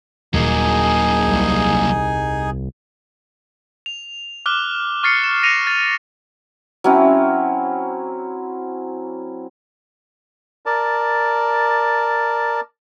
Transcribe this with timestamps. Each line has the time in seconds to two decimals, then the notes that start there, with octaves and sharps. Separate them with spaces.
0.33 D#1 F#3 A#3 D#4 G#4 G#5
1.28 C2
3.86 F7
4.46 D6 F6 F#6 G7
5.03 C#6 F6 A6 C7 C#7
5.24 E7
5.43 A#6 C#7 D#7 F7
5.67 A6
6.84 F#3 C4 C#4 E4
10.66 A#4 D5 A5